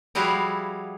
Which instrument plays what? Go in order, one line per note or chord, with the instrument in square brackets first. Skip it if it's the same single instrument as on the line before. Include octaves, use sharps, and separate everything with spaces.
[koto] F3 G3 E4 F#4 G#4 F5